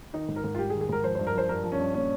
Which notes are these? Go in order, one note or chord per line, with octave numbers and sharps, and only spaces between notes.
D#3 D#4
G#2
A#4
G#2
F4
G3 G4
G#4
D#3
G#4
G#2 A#4
F3 C5
G2 C5
A#4
F3 C5
G2 A#4
F3
C#4
G2
A#2 C#4